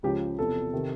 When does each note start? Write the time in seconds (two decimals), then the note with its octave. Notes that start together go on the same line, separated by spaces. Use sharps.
0.03 C#2 C#3 F3 G4
0.38 E2 C3 F3 A4
0.73 C3 D#3